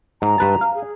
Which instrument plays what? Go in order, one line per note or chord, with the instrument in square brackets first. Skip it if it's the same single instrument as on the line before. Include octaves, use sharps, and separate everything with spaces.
[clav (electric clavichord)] G#2 [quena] A#5
[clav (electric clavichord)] G2 B4 A5
F5
[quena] G#4